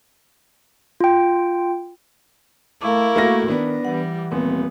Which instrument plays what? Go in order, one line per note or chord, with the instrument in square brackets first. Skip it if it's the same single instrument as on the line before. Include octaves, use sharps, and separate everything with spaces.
[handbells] F4 G5
[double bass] A3 [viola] E4 A#4 [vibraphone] F5 C#6 D6
[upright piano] A3 F#4 A#6 [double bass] A#3
[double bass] D#3 [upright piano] B3 D4 [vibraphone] B4
[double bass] E3 [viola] G3 [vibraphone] F#5
[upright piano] D#1 [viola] B3 [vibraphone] C4